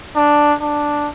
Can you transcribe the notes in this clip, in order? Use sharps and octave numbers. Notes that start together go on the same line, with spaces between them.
D4
D4